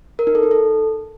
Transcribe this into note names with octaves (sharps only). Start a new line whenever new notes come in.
A#4
D#4
A4
D#4
A4